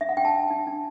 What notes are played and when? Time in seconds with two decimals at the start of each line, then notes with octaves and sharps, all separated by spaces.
0.01 D4 E5
0.09 F#5
0.17 D4 G5
0.25 A5
0.34 D4
0.50 D4
0.67 D4